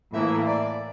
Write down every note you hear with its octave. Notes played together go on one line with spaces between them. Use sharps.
A2 E3 A#3 E5
D5